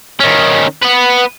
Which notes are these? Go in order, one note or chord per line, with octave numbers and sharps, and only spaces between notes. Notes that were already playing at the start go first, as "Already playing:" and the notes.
D#3 C#4
B3 B4